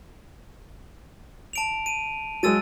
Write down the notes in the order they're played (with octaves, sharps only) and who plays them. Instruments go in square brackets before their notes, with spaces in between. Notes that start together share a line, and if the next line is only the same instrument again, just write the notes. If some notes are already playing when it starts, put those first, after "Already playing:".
[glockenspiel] A5 D7 F7
D#7
[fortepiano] F#3 G#3 [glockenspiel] E6 A6 D#7